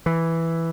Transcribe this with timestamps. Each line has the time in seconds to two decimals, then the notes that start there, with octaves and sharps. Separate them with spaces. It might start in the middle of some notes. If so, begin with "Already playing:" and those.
0.06 E3